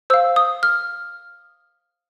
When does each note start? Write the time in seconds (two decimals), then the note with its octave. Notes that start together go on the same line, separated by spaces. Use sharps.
0.10 C5 F5 E6
0.36 D#6
0.63 F6